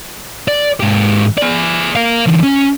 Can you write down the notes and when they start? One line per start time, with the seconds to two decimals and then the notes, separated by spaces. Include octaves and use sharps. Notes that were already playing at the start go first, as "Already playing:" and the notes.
0.48 D5
0.80 G#2 G4
1.38 G#4 D5
1.96 A#4 F5
2.27 D3 E3
2.44 C#4